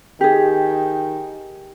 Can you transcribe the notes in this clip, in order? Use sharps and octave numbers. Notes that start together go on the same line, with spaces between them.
D#3 G4 G#4